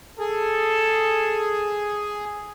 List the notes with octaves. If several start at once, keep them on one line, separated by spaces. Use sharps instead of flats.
G#4 A4